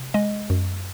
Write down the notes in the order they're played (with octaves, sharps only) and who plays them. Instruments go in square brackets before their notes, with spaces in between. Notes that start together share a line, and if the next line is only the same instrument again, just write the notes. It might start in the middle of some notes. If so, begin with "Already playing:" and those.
Already playing: [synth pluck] C3
G#3 D#5
F#2